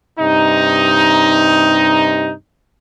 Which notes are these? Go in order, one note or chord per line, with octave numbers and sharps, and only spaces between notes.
G2 C3 D#4